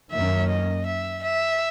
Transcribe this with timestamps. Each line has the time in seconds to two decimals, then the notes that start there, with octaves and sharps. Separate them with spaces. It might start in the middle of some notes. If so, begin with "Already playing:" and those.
0.11 F#2 D#3 A#3 C#4 E5
0.48 D#5
0.86 E5
1.23 E5